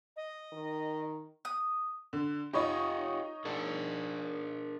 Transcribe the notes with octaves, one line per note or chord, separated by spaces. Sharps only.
D#5
D#3
D#6
D3
D#4 F4 G4 C#5 D#5
D4 G#4 A#4